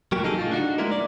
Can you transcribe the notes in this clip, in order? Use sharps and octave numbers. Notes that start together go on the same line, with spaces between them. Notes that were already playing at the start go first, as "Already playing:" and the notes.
F#3 A#3 G4
C#3 D#4 G#4 A4
A2 F4
D4 D#4 F#4
G#3 A#3 E4 A#4
D5